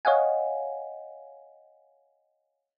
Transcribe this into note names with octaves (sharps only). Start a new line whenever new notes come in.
C#5 D#5 F5 F#5 G#5